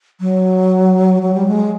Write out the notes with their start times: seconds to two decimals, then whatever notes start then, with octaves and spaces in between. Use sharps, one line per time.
0.21 F#3
1.22 F#3
1.34 G3
1.48 G#3